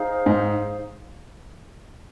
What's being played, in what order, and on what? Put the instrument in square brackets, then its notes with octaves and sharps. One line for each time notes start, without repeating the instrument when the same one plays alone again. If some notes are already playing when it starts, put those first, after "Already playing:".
Already playing: [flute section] D#4 G#4 C5 F5
[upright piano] G#2